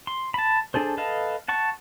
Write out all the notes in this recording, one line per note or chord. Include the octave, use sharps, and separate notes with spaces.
C6
A5 B5
D4 G#4 A4 C5
A4 B4 D#5 F5 A5
F#5 A5 C#6